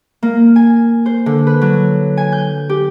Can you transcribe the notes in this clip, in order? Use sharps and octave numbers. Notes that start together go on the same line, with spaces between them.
A#3
G#5
C5
D3
B4
F#3
G#5
G6
G4